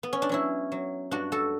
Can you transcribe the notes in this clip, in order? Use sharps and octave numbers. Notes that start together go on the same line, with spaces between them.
B3
C#4
D4
F#3 C#4 E4
F#3
G2 D4 F#4
F#4 A4